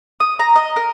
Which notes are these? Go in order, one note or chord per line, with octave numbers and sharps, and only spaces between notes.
D#6
A#5
D#5
A#4